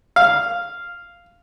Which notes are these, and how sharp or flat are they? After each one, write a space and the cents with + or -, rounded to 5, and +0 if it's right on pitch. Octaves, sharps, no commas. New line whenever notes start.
F5 -5